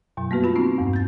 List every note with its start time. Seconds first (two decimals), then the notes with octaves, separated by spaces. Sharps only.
0.17 F#2 B2 F#3
0.30 G3 A#3 B3 F#4 B4
0.43 A3 F4 B5
0.56 A#3 C4 D4 D#4 F4 F#4
0.78 E2 G2
0.93 G6 A6